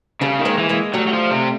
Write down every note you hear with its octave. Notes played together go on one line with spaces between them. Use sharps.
C#3 G3 A3
D#3
G#3 A#3
E3
G#3 A#3
F#3 G3 A3
F#3
F3
C3